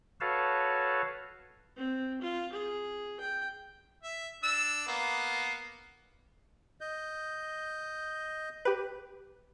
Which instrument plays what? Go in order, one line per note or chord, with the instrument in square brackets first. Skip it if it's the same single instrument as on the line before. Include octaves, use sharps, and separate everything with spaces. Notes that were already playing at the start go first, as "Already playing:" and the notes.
[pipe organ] F#4 A4 B4 C#5 F5 A5
[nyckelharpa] C4
F4
G#4
G5
[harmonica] E5
D4 E6
A#3 B3
[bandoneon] D#5 G6
[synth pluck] G4 B4